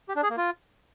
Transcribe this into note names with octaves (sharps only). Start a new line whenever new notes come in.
G4
D4
G#4
A#3
F4